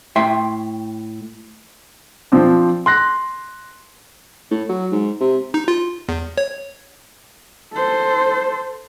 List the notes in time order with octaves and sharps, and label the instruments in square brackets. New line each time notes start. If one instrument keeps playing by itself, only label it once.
[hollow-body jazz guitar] A2 E5 G5 C6
[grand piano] F3 C4 D4
C6 F#6 A#6
[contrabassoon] A2
F#3
G#2
C3
[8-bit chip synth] D#4
F4
E2
C#5
[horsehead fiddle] A4 C5